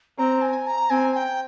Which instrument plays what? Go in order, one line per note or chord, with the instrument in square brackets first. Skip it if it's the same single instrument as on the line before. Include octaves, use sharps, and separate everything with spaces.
[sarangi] C4 [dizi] A#5
[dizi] G#5
A#5
[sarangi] C4 [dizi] G#5
[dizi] G5